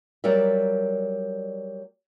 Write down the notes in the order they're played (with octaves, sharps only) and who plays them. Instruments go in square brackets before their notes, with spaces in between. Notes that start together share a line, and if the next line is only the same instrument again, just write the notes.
[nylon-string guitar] F#3 G3 A#4 D5 E5